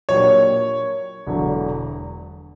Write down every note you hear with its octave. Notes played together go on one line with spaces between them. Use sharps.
A#2 F#3 A#3 D4 G4 C#5
E1 E2 D3 F#3